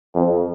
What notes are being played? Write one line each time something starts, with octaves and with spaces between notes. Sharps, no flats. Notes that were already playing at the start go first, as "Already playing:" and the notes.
F2